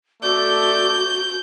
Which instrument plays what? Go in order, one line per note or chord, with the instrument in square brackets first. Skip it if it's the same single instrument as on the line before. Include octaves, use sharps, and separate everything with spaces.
[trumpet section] A3 A4 D5 [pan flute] F#4 [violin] G6